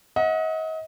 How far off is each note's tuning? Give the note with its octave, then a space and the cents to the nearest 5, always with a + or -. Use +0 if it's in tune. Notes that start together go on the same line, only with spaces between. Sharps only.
D#5 +35 F#5 -20